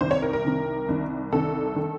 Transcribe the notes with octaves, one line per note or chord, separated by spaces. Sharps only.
C2 C3 D#3 C5
C#5
A#4
A#4
C2 C3 D#3
C2 C3 D#3
C2 C3 D#3 A4
D#3